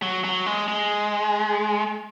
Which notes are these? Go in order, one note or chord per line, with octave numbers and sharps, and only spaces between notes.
F#3
F#3
G#3
G#3